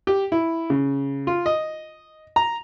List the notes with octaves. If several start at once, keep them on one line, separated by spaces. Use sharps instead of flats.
G4
E4
C#3
F4
D#5
A#5